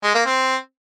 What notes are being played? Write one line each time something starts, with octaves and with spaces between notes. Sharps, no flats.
G#3
A#3
C4